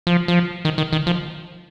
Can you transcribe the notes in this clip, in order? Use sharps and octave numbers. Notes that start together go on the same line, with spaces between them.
F3
F3
D#3
D#3
D#3
F3